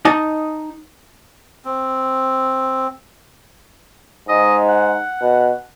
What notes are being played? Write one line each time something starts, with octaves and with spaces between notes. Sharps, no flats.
D#4 D#5 A5
C4
G#2 D#5
F#5
B2